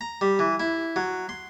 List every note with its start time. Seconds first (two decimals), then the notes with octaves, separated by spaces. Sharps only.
0.01 A#5
0.21 G3
0.39 E3
0.60 E4
0.96 F#3
1.29 C6